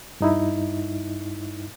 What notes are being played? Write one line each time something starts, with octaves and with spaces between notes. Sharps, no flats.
G2 D#4 E4